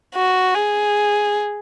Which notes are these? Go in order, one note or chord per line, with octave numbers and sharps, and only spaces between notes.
F#4
G#4